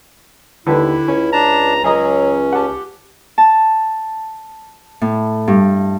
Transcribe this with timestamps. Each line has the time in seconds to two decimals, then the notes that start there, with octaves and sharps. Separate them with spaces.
0.67 D#2 D3 E4 G4 B4
1.08 C#2 C#4
1.33 D4 A5 A#5
1.84 C#2 F#3 C#4 G#4 D#5 A#5
2.53 G4 F#5 A5
3.38 A5
5.01 A2
5.48 G2